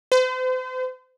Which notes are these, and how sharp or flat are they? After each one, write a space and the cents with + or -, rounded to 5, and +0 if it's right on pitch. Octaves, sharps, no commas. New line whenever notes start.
C5 -40